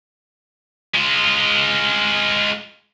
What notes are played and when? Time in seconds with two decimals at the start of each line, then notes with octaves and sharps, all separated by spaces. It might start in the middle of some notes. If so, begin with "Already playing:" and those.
0.95 G#3 F4